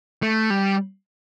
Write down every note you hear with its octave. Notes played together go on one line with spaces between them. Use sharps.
A3
G3